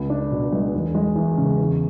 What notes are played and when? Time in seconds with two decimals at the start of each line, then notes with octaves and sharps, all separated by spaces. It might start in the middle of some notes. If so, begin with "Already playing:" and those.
Already playing: C#2
0.10 D4
0.31 B2
0.52 G#3
0.74 E1
0.95 G#3
1.16 E2
1.38 C#3
1.58 E2